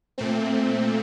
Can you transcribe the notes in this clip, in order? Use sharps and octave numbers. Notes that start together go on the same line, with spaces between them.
A#2 A3 C4